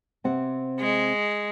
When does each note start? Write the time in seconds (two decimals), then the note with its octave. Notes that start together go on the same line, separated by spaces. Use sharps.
0.24 C3 C4 F#5
0.80 G#3